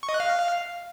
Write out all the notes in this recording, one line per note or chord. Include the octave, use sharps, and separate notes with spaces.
C#6
D#5
F#6
F5